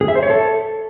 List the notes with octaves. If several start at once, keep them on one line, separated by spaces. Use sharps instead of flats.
G#4
E5
C5
C#5
A4